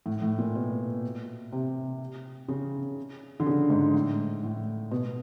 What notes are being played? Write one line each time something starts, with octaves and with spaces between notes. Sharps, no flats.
A2
A2
A#2
B2
C3
C#3
D3
C#3
G#2
A2
A2
B2